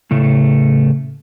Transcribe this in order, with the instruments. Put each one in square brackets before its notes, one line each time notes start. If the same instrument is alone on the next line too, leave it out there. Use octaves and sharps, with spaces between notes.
[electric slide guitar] A2 C#3 A3